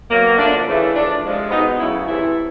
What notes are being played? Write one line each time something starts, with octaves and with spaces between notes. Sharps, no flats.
B2 F#3 A#3
D3 F3 A3 D4
C#3 E3 A3
A2 F3 A3 D4
C3 F3 G#3
B2 G#3 B3 D#4
C#3 F#3 A3 E4
C3 E3 A3 E4